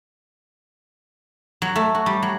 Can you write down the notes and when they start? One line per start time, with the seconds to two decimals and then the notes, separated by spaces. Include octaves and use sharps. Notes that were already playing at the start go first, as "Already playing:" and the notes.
1.62 F#3
1.76 A3
1.95 F#4
2.06 G3
2.22 F#3